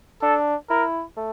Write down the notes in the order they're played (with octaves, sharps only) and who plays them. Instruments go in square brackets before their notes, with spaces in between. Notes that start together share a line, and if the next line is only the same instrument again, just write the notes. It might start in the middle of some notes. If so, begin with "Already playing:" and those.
[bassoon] D4 [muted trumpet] A4
[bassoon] E4 [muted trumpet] A#4
[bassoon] A3